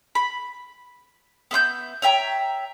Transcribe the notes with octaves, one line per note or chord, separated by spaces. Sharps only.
B5
B3 E5 C6 G6
C#5 E5 G5 A#5